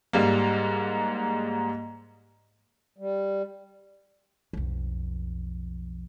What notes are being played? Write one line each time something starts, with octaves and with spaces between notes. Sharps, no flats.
G#2 G3 A#3
G3
B1 F2